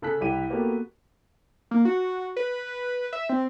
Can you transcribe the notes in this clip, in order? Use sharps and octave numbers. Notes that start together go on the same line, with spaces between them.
C#3 A4 F#6 B6
C2 E4 G4 G5 D#7
A#3 B3 F#4 G4 A4
A#3
F#4
B4
E5
C4